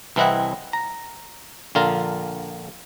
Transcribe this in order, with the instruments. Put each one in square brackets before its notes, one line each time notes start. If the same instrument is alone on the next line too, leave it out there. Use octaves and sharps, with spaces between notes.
[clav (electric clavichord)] C2 E3 C4 E4 D#5 F#5
A#5
A#1 D3 F4 A#4